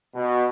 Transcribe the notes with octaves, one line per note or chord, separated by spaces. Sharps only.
B2